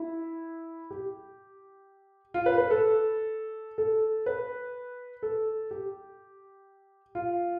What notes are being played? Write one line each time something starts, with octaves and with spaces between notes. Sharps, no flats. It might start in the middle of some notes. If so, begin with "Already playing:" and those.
Already playing: E4
G4
F4
B4
B4
A4
A4
B4
A4
G4
F4